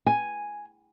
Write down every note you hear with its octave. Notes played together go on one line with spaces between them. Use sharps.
G#5